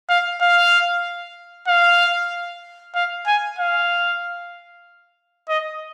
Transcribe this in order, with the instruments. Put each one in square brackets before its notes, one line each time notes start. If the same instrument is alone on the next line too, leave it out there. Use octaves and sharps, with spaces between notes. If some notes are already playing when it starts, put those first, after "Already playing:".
[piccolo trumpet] F5
F5
F5
F5
G#5
F5
D#5